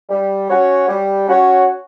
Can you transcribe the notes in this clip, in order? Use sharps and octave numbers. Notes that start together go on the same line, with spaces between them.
G3
C#4 F#4 C#5
G3
C#4 F#4 C#5